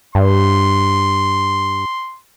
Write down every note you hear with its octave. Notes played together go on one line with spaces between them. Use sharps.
G2 C6